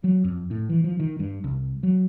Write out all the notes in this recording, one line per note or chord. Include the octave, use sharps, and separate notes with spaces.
F#3
F2
A2
E3
F3
D#3
G2
C2
F#3